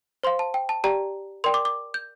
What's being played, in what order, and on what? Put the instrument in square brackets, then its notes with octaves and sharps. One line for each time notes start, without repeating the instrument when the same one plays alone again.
[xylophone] C5 F5 C6
A5
G5
A5
G4 D5 G5 A#5
A#4 D5 G5 C6
D6
D6
G6